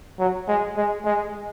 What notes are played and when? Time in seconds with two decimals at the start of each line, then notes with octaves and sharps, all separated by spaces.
0.20 F#3
0.48 G#3
0.77 G#3
1.05 G#3